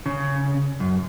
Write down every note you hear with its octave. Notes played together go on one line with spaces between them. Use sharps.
C#3
F#2